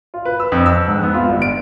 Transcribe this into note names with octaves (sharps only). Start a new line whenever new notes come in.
F4
B4
E6
F2
E6
G#2
B3
F4
G1
D7